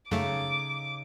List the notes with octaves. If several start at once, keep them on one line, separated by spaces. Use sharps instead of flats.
F#2 C#3 A3 D#4 A4 D6